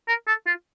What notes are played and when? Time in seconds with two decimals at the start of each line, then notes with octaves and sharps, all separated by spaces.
0.08 A#4
0.28 A4
0.47 F4